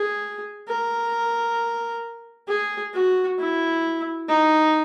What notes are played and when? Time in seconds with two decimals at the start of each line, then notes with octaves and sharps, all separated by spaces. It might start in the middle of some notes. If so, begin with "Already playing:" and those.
Already playing: G#4
0.68 A#4
2.48 G#4
2.94 F#4
3.39 E4
4.29 D#4